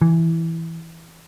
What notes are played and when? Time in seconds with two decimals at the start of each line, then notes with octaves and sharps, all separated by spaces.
0.01 E3